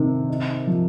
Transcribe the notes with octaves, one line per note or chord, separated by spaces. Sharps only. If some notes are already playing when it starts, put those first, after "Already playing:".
Already playing: C3 D#3
D#4
F3